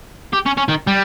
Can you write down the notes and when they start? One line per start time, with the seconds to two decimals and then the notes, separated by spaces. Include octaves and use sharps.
0.33 G4
0.46 C#4
0.57 C#4
0.68 D#3
0.87 G3